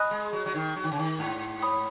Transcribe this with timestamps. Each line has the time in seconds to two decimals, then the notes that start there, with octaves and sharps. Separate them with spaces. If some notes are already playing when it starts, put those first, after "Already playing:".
Already playing: D#5 G#5 B5 D#6 F#6
0.11 G#3
0.33 F#3
0.46 F#3
0.54 D#3
0.76 F#3
0.84 D#3
0.91 C#3
0.99 D#3
1.19 G#2
1.62 C#5 B5 D#6